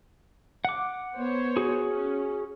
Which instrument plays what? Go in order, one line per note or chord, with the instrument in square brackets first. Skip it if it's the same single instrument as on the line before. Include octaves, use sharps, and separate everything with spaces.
[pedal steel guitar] F#5 D6
[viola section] B3 C5 C#5
[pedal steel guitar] F#4 G#4
[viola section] C#4